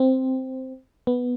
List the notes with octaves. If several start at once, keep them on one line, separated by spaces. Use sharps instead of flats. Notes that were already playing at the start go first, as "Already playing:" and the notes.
Already playing: C4
B3